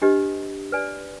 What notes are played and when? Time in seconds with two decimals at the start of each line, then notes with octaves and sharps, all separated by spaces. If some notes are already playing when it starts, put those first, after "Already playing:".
0.02 D4 G4 B4 D#5
0.72 B4 D5 G#5